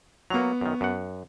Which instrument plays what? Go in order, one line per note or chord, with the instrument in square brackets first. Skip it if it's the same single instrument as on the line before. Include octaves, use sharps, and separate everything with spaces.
[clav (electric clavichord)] F#3 A#3 [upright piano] B3 C#6 F7
[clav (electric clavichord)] F#2 D#3
F#2 F#5